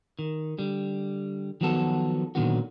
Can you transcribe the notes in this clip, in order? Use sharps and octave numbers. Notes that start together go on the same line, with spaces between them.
D#3
D3 G3
D#3 F3 F#3 B3 F#4 A4
A#2 D3 D#3 F#3 B3 F#4